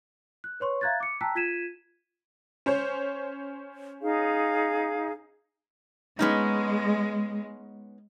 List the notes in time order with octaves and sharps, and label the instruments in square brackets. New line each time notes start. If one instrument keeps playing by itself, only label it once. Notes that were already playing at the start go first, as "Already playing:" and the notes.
[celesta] F#6
B4 C#5 C6 C#6
E5 F5 A#5 F#6 G#6 A6
D6 C#7
G5 A5 A#5 E6 F#6 B6
F4 G#6 B6 D#7 E7
[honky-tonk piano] C#4 C5 C#5
[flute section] D#4 G#4 F5
[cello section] G#3 [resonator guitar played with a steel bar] B3 C#4 D#4